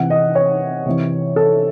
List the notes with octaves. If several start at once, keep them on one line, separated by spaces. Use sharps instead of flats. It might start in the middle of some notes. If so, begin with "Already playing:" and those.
Already playing: C3 E3 F#5
D#5
C#5
C3 E3
A4